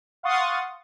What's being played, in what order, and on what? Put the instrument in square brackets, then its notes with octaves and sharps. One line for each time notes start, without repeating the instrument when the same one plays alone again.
[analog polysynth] F5 F#5 C6 C#6 D#6 A6